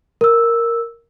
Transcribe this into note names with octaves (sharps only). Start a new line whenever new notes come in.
A#4 E6